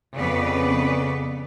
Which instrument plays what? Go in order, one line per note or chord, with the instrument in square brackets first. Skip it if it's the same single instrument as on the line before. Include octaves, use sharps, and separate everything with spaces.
[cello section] F2 C#3 B3 B4 D5